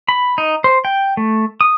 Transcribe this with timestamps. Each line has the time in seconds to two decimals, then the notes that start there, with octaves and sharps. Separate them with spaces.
0.09 B5
0.38 D#4
0.64 C5
0.85 G5
1.17 A3
1.61 D#6